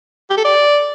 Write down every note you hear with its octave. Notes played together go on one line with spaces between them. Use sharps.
G4
A4
D5